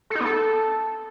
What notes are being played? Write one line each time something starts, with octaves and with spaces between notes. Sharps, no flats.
A4
D#4
B3
A4